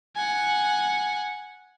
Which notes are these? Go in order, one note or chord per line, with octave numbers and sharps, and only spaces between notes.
F#5 G#5